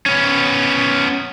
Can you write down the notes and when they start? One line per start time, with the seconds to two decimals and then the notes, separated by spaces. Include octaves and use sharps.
0.06 B3 C#4